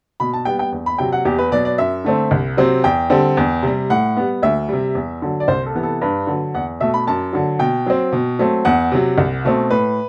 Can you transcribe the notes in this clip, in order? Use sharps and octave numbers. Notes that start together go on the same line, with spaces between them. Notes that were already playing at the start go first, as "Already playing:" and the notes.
B2 B5
A5
G3 B3 G5
G5
E2
B5
C3 F#3 G5
F#5
E2 G4
B4
B2 F#3 B3 D5
D5
F#2 E5
D3 A3 C4
C2
C3 F#3 C4
E2 G5
D3 G3 C4
E2
C3 G3
A2 F#5
G3 B3
D2 E5
C3 G3
E2
D3 F#3
D5
C2 C5
A4
C3 E3 B3
A4
G2 B4
D3 F#3
E2 F#5
B2 A3 E5
B5
F#2 A5
D3 F#3
B2 G5
F#3 C4
B2
F#3 A3 C4
E2 F#5
C3 F#3
C2
B2 A3 C4
A2 B4